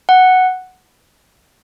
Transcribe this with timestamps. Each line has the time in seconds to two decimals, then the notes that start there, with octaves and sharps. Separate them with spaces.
0.09 F#5